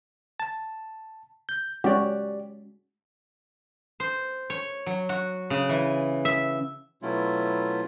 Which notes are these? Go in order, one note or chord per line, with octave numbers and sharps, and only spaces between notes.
A5
G6
G#3 C#4 F#4 G4 D5
C5
C#5
F#3
F#4
C#3
E3
E5
B2 F#3 A3 C#4 E4 F4